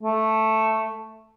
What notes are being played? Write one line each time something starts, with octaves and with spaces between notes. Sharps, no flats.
A3